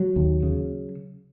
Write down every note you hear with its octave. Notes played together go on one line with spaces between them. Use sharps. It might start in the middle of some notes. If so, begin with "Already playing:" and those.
Already playing: F#3
D#2
C#3